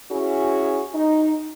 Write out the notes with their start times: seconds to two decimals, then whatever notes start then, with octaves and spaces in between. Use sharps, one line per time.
0.11 C#4 E4 F#4 G#4
0.94 D#4